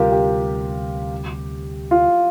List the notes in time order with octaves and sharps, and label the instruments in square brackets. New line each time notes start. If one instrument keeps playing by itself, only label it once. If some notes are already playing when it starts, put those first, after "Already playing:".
Already playing: [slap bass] D2 C3 G3 [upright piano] F4 G4 A#4
[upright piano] G4
F4